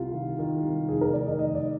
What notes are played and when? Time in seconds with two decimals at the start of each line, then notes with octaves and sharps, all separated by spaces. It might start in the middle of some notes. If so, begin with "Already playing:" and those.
Already playing: C2 F4
0.13 D#3
0.39 D#3
0.63 C2
0.89 F1 G#4
1.01 A#4
1.13 D#3 D5
1.27 D#5
1.39 F1 D#5
1.55 D5